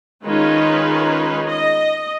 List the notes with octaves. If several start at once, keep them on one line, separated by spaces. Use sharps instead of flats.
D#3 G#3 C#4 D#4 F4 B4
D#5